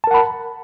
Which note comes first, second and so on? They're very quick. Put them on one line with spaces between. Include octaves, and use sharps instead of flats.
A5 A#4 F#5 B5